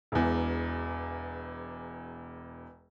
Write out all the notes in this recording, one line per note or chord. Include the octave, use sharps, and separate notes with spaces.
E1 E2